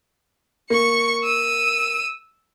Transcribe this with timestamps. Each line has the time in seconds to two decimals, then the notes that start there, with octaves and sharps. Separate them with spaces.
0.70 A#3 C#6 C#7
1.24 E6 D#7